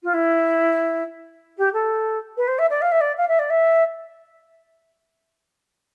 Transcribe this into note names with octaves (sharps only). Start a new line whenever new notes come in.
F4
E4
G4
A4
B4
C5
E5
D5
F5
E5
D5
F5
E5
D5
E5